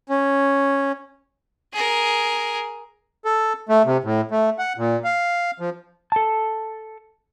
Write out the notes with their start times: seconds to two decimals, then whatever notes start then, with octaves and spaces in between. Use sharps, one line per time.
0.09 C#4
1.73 G#4 A#4
3.25 A4
3.69 A3
3.85 C3
4.04 A2
4.31 A3
4.58 F#5
4.78 A#2
5.04 F5
5.60 F3
6.12 A4 A5